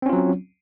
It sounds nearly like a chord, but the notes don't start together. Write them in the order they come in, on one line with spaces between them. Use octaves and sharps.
C4 C#4 F4 F#3